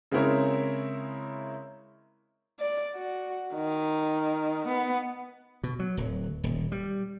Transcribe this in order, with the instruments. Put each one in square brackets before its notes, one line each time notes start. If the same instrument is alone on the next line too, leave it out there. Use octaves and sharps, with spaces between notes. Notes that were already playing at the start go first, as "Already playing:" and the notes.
[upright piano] C#3 G#3 C4 E4 A#4 C#5
[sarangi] D5
F#4
D#3
B3
[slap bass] B2
F#3
D1
D#1
G3